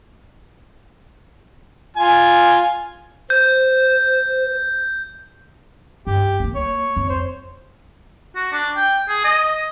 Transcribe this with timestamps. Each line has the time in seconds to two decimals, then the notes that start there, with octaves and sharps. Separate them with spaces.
1.97 F4 G#5
3.30 C5 G6
6.07 G2 G4
6.40 A#3 B3
6.55 C#5
6.97 F2
7.09 C5
8.36 F#4
8.52 D4
8.77 G5
9.08 G#4
9.24 D#5